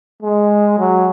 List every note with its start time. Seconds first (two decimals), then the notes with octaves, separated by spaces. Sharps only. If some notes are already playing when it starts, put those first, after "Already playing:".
0.23 G#3
0.79 F#3